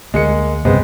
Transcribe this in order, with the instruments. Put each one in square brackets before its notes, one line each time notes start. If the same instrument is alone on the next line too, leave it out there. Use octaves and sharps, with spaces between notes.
[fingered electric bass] D2 [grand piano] G#3 A#3 C#7
[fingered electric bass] C2 G2 C#3 [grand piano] G#3 B3 C4